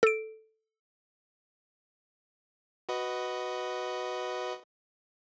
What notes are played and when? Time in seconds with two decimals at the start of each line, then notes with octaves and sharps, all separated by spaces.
0.03 A4 D7
2.89 F#4 B4 D#5